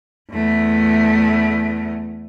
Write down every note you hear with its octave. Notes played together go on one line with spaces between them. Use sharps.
E2 A3